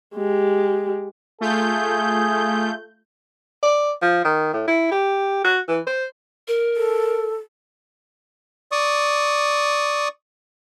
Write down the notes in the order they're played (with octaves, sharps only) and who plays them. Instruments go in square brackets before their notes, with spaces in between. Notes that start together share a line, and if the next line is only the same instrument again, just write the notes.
[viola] G#3 G4
[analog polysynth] A3 F4 G6 [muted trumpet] G#4
[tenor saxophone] D5
F3
D#3
A2
E4
G4
F#4
E3
C5
[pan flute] A#4
[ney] A4
[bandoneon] D5 C#6 D#6